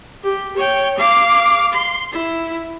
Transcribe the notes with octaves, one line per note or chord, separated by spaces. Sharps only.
G4
C#5 G5
F5 D6
C6
E4